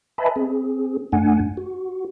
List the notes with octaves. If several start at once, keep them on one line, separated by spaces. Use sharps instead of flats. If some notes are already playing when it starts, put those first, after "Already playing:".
B4 D#5 E5 G#5 A5 B5
C4 G#4
F#2 A3 D4 F#5 G#5
F#4